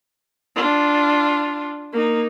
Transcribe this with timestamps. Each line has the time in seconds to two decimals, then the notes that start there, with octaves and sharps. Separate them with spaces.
0.56 D4 F4
1.93 A#3 D#4